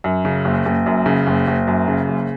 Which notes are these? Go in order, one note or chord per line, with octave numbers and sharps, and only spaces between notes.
F#2
C#3
F#1
F#1
F#2
C#3
F#1
F#1
F#2
C#3
F#1